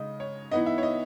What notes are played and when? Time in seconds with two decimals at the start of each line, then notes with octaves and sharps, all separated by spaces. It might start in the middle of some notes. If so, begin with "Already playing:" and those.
Already playing: C#3 G#3 D#4 D#5
0.20 C#5
0.51 E3 B3 D#4 D#5
0.66 E5
0.78 C#5
0.83 D#5